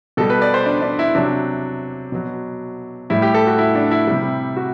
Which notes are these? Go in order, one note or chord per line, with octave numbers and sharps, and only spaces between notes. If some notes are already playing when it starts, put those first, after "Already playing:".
B2 G3 A4
B4
D5
C5
D4
D4
E4
C3 F#3 D4
B2 F#3
A2 G3 E4
G4
A4
F#4
E4
D4
E4
C3 G3
F#4